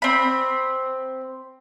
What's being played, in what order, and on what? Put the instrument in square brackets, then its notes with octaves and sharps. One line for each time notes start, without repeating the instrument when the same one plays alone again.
[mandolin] C4 B5